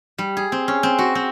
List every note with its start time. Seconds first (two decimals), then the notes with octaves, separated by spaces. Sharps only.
0.18 G3
0.37 G#4
0.52 C4
0.68 C#4
0.83 C4
0.98 F#4
1.15 C4